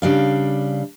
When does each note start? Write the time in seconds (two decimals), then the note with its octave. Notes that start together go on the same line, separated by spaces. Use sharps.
0.02 C#3 G3 D4 F5